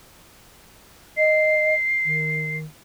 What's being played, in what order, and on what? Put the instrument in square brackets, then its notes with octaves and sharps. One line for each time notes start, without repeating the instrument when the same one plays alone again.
[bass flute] D#5 [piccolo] C7
[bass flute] D#3